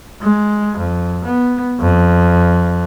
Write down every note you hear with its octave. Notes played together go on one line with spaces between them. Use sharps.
G#3
F2
B3
F2